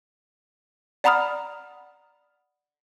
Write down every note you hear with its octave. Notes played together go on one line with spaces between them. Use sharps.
D5 F#5 A#5 B5 D#6 F6